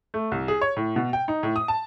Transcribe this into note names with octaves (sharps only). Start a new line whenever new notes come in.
A3
C2
G#4
C#5
A2
B2
G5
D#4
A2
D#6
A5